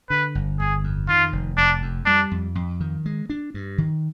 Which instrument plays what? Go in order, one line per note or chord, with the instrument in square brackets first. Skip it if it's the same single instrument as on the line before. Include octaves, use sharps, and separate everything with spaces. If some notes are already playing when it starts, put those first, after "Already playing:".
[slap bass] D3 [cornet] B4
[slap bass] G1
[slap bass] G1 [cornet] G#4
[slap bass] F2
[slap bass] D#3 [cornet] F4
[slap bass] F1
[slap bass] F1 [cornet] D4
[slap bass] F2
[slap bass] G3 [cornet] D4
[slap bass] F2
F2
D#3
G#3
D4
G2
D#3